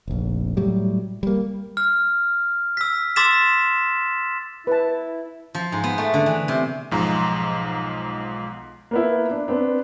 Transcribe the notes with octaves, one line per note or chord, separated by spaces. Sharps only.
F1 A#1
A2 F#3 G3
G3 A#3
F6
E6 B6
C6 D6 E6 A6 B6 E7
E4 B4 A5
F3
G#2
B3
A3
D3
E3
C3
B1 G#2 F3 A#5 C6
A#3 B3 E4
D4
B3 C4 D4